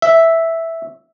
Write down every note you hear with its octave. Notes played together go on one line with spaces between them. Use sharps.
E5